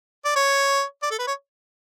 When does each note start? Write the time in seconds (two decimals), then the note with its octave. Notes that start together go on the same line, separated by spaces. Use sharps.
0.25 D5
0.36 C#5
1.03 D5
1.11 A4
1.19 B4
1.27 C#5